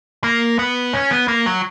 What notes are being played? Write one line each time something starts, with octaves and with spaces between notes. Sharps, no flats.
A#3
B3
C#4
B3
A#3
F#3